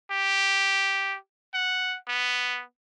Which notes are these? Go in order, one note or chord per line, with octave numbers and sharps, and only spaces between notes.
G4
F#5
B3